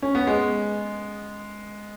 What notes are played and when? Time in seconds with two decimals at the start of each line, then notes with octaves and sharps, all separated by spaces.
0.02 C#4
0.15 B3
0.27 G#3